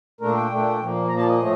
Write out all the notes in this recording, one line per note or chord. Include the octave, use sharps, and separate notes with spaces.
A#2 A3 D4 A#4
G5
A#2 A3 D4
A#2 F3 A#3
A#2 F3 A#3 A#5
A5
D#5
A2 F3 A3